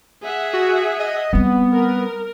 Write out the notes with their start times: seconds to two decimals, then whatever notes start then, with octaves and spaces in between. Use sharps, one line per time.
0.24 G#4 E5 F#5
0.53 F#4
0.99 D#5
1.33 G3 B3 C4
1.72 A#4